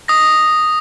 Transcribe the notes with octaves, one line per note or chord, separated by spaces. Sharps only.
D#6 A#6